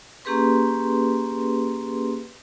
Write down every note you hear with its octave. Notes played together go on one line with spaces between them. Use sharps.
A#3 C#4 G4 G#4 B4 C6